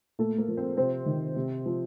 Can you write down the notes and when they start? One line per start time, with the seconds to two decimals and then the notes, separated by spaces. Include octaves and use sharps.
0.19 A#2 A3 A4
0.38 A#3 A#4
0.48 F3
0.57 C4 C5
0.77 C3 C4 C5
1.06 D#3
1.36 C3
1.66 F3